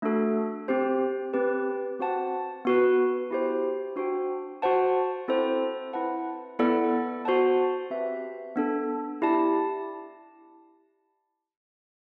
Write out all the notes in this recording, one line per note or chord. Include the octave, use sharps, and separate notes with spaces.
A3 D4 F#4 A4
C4 G4 C5
C4 G4 B4
C4 F#4 C5 F#5 A5
B3 F#4 B4
E4 G4 C5
D4 F#4 C5 G5
F#4 C5 F#5 A5
C4 E4 A4 C5
E4 B4 F#5 A5
B3 E4 A4 D5 F#5
F#4 C5 F#5 A5
C4 G4 B4 E5
B3 D4 A4
E4 G4 D5 A5